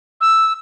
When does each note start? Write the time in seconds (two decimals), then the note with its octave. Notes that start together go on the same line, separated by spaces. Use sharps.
0.21 E6